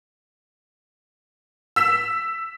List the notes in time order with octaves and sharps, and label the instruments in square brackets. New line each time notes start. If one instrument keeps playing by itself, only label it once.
[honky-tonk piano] E6 B6 E7